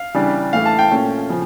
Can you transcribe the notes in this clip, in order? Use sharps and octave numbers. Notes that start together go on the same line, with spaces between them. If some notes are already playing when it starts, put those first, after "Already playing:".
Already playing: F5
C#3 E3 G3 D4
A2 E3 A3 F5
A5
G5
A#2 A3 C#4
C#3 F3